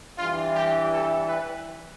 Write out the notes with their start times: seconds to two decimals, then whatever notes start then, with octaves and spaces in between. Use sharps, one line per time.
0.16 E3 G3 D4 F4
0.54 G4
0.91 A4
1.28 B4